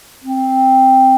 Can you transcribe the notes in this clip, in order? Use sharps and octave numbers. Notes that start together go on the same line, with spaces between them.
C4